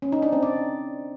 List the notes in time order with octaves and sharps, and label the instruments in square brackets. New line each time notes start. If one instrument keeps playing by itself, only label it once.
[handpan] C#4
D#4
D4
C4
D5